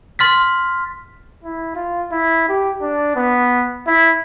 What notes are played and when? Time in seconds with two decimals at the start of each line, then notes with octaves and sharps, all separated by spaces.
0.19 C6 F6 A6 B6
1.44 E4
1.75 F4
2.12 E4
2.49 G4
2.82 D4
3.16 B3
3.87 E4